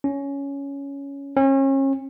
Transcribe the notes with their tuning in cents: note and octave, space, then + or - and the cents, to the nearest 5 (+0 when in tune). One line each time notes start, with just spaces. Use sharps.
C#4 +10
C#4 -35